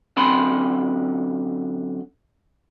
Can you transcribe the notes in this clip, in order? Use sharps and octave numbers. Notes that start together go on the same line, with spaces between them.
F#2 D3 C4 G#5 B5 C6